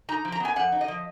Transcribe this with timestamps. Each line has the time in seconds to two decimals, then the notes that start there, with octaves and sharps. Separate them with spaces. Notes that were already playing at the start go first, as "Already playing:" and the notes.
0.09 D#4 A#5
0.25 F3
0.32 A#5
0.40 B3 G#5
0.56 F2 F#5
0.72 D#4
0.81 D#5
0.88 F3